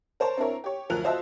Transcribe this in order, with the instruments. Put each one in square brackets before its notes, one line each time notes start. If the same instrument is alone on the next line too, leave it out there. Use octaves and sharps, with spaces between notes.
[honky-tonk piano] A#4 C5 C#5 A5
C4 D4 E4 A#4 C#5
G4 C#5
D2 F3 F#3 A#4 F#6 F7
F4 F#4 C5 D#5 E5 A5